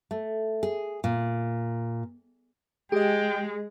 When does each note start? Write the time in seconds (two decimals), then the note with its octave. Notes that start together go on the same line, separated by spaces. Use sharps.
0.11 A3
0.63 G#4
1.04 A#2
2.92 G#3 G4 G#4 D#5 G5